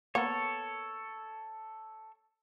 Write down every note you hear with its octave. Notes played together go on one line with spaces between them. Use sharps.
A#3 B3 A4 A#4 C#5